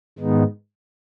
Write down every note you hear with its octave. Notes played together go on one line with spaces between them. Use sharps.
G#2 D#3 G#3 B3 D#4